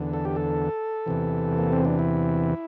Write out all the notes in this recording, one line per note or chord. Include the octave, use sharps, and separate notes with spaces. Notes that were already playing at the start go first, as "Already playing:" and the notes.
Already playing: E2 D3
A4
G4
A4
E2 C3 E3
A#3
C4
D4
E4